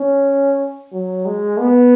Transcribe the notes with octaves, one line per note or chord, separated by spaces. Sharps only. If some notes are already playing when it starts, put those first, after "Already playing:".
Already playing: C#4
F#3
G#3
B3